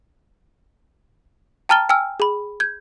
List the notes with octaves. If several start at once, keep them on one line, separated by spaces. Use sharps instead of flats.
G5 A5 A#5 F6 A6 G7
G5 G#5 E6 F6
G#4 B5
G6 G#6